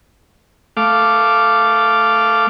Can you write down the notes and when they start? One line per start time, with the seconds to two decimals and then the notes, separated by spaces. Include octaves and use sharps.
0.77 A3 F5 D6